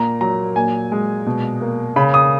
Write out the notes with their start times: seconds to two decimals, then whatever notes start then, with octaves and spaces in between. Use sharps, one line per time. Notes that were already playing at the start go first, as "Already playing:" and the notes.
Already playing: A#2 A#3 A#5
0.21 F#3 A#5
0.56 A#2 G#5
0.92 G#3
1.26 B2
1.61 A#3
1.96 C#3 B5
2.14 D#6